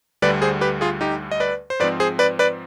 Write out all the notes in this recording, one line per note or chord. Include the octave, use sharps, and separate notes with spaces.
D2 D3 G3 B4 D5
G#4 C5
G4 B4
F4 G#4
D#4 G4
D#5
B4 D5
C5
G#2 F3 C4 B4 D5
G#4 C5
B4 D5
B4 D5